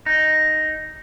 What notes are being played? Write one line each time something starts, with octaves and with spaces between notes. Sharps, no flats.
D#4